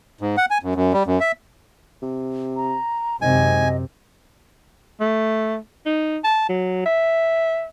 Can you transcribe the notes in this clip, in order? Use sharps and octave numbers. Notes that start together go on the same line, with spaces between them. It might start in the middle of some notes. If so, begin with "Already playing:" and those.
G#2
F#5
G#5
F#2
F#2
G3
F#2
E5
C3
A#5
G#1 F#2 C3 D#5 G#5
A3
D#4
A5
F#3
E5